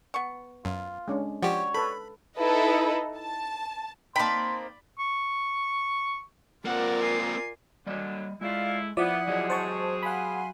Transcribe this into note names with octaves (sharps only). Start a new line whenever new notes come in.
B3 C#6
F#2 F4
G#3 C#4 D4
F3 G3 F#4 G4 C#5
A4 B4 B5
D#4 E4 A4 B4 D#5
A5
A#3 C4 D#4 D5 G5 A5 B5 C6
C#6
A#3 C4 F4 A#4 D5 F#5
G#5 C7
D3 F#3 G3 D5 D#5
G#3 A3 E4 F4 D5 F5
F3 B3 E4 D5 E5 F#5 D#6
F#3 G#3 C4 G4 G#4 D#5
C5 A5 C#6
F5 F#5 G#5 B5 C6